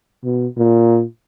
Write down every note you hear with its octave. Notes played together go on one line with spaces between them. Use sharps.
B2
A#2